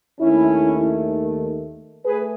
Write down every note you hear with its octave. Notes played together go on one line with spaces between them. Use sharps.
D#2 D#3 A3 C#4 E4
A3 G#4 B4